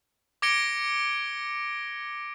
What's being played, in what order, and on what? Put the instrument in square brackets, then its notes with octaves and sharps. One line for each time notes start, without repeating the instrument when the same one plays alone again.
[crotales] D6 G#6 A#6 C#7 D7 G7